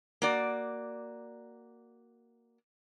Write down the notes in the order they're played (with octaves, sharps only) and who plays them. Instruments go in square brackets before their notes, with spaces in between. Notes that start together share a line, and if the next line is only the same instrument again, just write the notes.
[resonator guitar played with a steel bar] A#3 F#4 D5